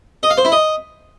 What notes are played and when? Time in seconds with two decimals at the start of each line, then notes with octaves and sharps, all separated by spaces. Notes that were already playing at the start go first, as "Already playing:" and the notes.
0.23 D#5
0.30 F5
0.38 C5
0.45 E4
0.52 D#5